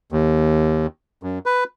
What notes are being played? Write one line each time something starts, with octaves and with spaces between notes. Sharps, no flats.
D#2
F#2
B4